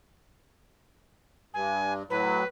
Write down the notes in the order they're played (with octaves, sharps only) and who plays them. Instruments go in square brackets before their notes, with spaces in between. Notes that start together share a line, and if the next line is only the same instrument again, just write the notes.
[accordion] G2 [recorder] G#5
[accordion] A2 F#3 [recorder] B4